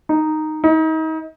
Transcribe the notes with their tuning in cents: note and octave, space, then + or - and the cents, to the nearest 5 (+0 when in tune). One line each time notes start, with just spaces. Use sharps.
D#4 -5
D#4 +35